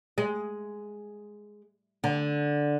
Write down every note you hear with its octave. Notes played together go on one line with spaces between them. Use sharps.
G#3
D3